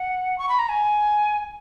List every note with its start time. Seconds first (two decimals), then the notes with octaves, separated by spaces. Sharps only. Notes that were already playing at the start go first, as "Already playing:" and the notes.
Already playing: F#5
0.38 C#6
0.49 B5
0.59 A#5
0.69 G#5